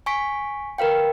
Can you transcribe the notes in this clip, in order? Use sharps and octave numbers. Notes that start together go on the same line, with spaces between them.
G#5 C#6 B6 D7
A#4 B4 F5 G5